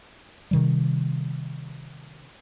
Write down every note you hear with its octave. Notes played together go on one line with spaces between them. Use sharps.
C3 D#3 G3